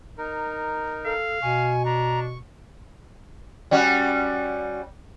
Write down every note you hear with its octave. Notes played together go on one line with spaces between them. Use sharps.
D#4 A#4
A4 F5
B2 G#5 C#6
D4 A#5
G3 C#4 F#4